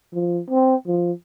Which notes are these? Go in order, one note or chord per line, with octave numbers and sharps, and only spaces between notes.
F3
C4
F3